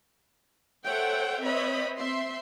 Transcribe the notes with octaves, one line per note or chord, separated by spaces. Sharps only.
A4 C5 C#5 E5 F#5 G5
C4 B4 C#5 D#5 E5 B5
C4 E5 C6